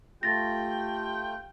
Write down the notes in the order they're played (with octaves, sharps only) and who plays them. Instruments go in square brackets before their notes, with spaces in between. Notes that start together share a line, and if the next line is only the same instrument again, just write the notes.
[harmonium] A3 F4 [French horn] G4 [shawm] G5 [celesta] A6 A#6